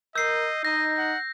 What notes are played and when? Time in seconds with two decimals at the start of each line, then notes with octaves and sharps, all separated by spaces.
0.16 A#4 D#5 E6 G6 C7
0.65 D#4 D#5 A#6
0.98 F#5